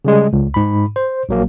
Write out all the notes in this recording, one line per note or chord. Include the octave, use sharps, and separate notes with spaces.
C#3 G3 G#3
C#2
G#2 B5
C5
A#1 F#3 A#3